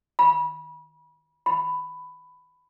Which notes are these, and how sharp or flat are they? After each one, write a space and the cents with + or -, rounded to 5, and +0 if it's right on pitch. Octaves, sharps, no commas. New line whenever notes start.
B5 -30
B5 +15